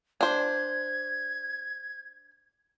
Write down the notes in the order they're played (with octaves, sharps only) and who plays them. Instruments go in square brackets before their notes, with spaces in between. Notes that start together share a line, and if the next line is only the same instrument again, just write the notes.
[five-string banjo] D4 C5 [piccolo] G#6